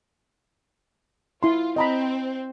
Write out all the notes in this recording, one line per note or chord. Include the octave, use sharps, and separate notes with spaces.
E4 F4 C6
C4 D#5 A#5 B5